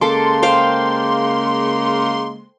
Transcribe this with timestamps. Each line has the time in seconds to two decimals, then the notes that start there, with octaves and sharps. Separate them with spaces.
0.01 C#3 G#3 A#3 A4 C6 D6
0.43 C5 F5 G5